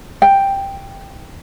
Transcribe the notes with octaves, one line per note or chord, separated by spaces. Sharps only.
G5